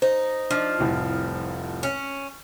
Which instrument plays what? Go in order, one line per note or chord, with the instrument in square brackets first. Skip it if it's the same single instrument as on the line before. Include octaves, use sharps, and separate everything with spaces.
[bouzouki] D#4 [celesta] C5
[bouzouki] F3 [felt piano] D4 D#4
[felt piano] F1 C2 A2
[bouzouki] C#4